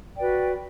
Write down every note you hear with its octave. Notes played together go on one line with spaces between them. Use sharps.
F#4 B4 D5 G5